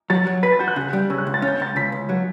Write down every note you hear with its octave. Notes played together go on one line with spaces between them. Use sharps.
F#3 A6
F#3
B4 B6
A6
F#4 G6
F#6
C#3
G3
C#3 E6
F#6
C#2
A6
C#4
G6
C#2 A6
C#2 B6
C#2
F#3